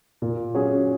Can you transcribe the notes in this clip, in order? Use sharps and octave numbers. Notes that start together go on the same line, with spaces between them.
A#2
F#3 C#4 G#4